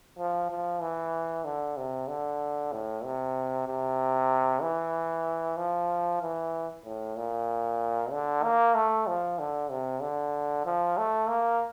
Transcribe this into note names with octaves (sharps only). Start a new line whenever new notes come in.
F3
F3
E3
D3
C3
D3
A2
C3
C3
E3
F3
E3
A2
A#2
D3
A#3
A3
F3
D3
C3
D3
F3
A3
A#3